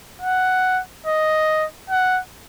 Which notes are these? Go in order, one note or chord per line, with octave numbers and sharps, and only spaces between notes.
F#5
D#5
F#5